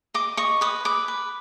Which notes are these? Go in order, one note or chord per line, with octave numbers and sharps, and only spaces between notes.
D#5 D6
D#5 C#6
B4 D#6
B4 D6
B4